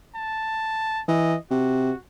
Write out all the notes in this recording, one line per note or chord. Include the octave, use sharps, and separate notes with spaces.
A5
E3 D#5
C3 F#4